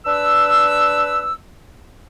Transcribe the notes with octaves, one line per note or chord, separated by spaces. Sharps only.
D4 B4 E6